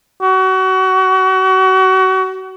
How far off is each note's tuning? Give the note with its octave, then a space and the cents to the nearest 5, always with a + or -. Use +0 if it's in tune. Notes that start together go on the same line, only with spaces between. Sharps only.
F#4 +30